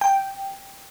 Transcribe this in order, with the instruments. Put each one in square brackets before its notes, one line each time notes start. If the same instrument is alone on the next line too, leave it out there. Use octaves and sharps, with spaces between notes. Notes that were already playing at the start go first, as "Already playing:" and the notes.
[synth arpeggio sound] G5